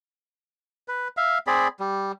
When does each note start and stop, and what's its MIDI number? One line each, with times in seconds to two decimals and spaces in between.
0.88 1.08 71
1.17 1.38 76
1.17 1.38 77
1.47 1.68 60
1.47 1.68 68
1.47 1.68 74
1.47 1.68 83
1.80 2.12 55